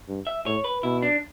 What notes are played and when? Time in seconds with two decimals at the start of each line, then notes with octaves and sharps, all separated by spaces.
0.08 G2
0.27 E5
0.46 A2 C#5
0.64 B4
0.83 B2 E4
1.02 D4